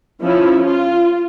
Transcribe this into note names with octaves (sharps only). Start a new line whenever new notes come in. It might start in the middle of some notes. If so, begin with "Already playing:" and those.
F3 C#4 E4
F4